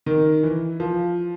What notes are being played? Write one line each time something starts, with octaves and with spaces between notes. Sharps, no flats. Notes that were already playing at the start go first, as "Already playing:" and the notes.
D#3
E3
F3